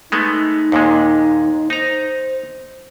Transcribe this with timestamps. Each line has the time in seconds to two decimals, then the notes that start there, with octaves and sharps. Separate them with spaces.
0.12 G#3 A3 B3 D#4
0.72 D#2 A#2 G#3
1.70 D#4 C5 A#5